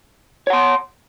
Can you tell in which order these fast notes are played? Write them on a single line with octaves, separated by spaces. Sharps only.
C#5 F#5 C6